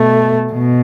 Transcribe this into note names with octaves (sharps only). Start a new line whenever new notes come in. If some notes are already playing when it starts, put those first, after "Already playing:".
Already playing: B2 A3
B2